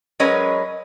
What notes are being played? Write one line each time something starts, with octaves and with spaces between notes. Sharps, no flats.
F#3 G#3 C#4 A#4 B4 D#5